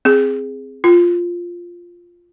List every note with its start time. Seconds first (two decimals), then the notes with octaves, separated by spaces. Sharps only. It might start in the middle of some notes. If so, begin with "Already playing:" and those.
0.05 C4 G#4
0.84 F4